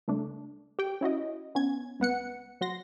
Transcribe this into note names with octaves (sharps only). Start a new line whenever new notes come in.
C#2 A3 D4
G4 G5
C#4 E4 F#4 D#5
B3 C#4 G#6
C#2 B3 F#5 C#7
F#3 F#4 C6 A#6